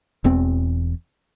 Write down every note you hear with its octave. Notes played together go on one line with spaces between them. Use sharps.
E1 E2 C4